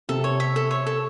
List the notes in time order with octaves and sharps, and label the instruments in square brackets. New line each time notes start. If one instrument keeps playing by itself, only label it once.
[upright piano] C3 [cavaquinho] A4
[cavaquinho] C#5
E5
A4
C#5
A4